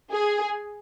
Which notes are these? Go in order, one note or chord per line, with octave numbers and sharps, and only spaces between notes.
G#4